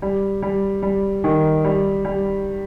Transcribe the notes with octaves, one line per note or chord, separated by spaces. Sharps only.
G3
G3
G3
D#3
G3
G3